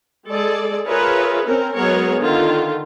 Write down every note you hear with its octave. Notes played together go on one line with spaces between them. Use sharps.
G#3 G#4 A4 D5
F4 G#4 A#4 B4 C#5 E5
C4 C#4 A#4
F#3 G#3 B3 G#4 A#4 C#5
D3 D#3 F4